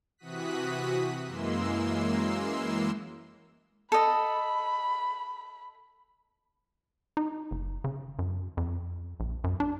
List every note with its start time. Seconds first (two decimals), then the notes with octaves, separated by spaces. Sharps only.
0.18 C3 E3 F#4 D#6 F#6 B6
1.26 F#2 E3 G#3 A#3 C6 E6
3.92 A4 D#5 B5
7.17 D#4
7.51 F#1
7.84 C#3
8.19 F#2
8.57 F2
9.20 A#1
9.44 F#2
9.60 D4